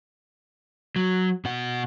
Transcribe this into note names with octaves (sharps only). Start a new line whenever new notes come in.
F#3
B2 F#5